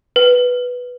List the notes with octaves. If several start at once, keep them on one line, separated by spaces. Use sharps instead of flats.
B4